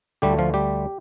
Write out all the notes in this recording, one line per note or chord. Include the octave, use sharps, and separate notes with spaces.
D2 D3 G3 A3 G4
F3 F4
G3 G4